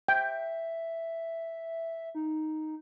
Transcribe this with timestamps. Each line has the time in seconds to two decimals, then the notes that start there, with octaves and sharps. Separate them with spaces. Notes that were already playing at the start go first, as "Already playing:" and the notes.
0.08 E5 G5
2.15 D#4